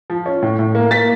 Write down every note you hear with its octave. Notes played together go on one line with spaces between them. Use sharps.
F3
C#4
A2
A2
A#3
A#3 A6 B6